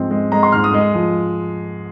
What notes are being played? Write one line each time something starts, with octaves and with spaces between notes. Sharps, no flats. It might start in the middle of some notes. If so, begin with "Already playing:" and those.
Already playing: G#2 F3 G#3 C4
G#3
G#3 A#5
C6
G#2 F6
D#6
G#3
F3